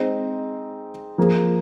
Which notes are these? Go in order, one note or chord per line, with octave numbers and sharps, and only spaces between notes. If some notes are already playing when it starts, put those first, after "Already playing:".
Already playing: G#3 C4 D#4
F3 A#3 G#4